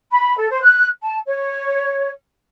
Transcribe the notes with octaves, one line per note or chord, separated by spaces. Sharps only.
B5
A4
C5
F#6
A5
C#5